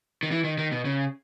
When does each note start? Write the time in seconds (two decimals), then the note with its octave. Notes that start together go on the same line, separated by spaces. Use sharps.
0.23 D#3
0.31 E3
0.44 D#3
0.58 D#3
0.71 B2
0.85 C#3